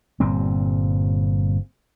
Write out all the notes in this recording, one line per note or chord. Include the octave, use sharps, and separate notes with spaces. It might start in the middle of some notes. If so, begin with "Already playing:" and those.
G1 A#2 G3 C4